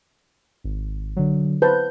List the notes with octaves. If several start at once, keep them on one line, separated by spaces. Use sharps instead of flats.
G#1
D3 F#3
B4 C5 A5 G6